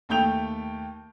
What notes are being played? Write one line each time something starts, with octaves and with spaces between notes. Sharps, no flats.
D#2 A3 G5 G6 F7